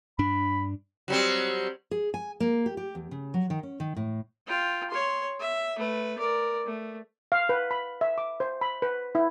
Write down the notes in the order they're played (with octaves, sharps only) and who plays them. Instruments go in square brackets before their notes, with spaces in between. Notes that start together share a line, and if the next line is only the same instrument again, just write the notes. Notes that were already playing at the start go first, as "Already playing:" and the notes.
[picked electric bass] G2 D4 [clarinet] B5
[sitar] F#3 G3 C4
[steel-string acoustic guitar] G#4
G#5
A#3
G4
G4
E2
C#3
F#3
D#3
C#4
D#3
A2
[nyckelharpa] F4 G5
C#5 C6
E5
A3 B4
A#4 D5
A3
[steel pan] F5
B4
B5
E5
D6
C5
B5
B4
E4